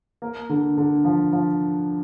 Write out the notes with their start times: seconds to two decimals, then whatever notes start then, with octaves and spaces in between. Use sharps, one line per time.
0.22 A#3
0.49 D3
0.77 D3
1.04 F3
1.33 F3